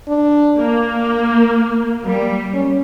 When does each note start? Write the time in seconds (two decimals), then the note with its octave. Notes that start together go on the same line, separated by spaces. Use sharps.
0.08 D4
0.58 A#3
2.05 G3 A#3
2.54 C#4